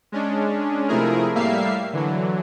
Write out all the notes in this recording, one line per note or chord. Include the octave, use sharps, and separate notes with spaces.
G#3 C#4 D4
C3 F3 A3 E4 G#4 A#4
A2 G3 A#3 E5 F5 C7
D3 E3 F#3